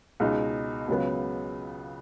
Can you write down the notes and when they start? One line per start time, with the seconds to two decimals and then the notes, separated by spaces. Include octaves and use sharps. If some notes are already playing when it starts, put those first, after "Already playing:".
0.20 C#2 B2 G#3 D#4
0.88 C#2 C#3 F#3 B3